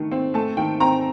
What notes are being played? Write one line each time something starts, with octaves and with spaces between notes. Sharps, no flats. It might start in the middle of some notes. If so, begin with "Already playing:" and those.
Already playing: D#3 A3
C4
A3 A5
D#3 G5
C4 A#5